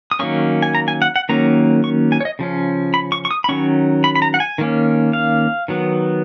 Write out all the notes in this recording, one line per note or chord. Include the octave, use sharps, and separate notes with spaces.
D#6
D#3 F#3 A#3 C#4 C#6
G#5
A#5
G#5
F#5
F#5
D#3 F#3 A#3 C#4 A#5
C#6
G#5
C#5
D#5
C#3 F3 C#4
B5
C#6
C#6
D#6
B5
D#3 F#3 C#4 C#6
B5
B5
A#5
F#5
G#5
D#3 A#3 C#4
F5
D#3 F#3 B3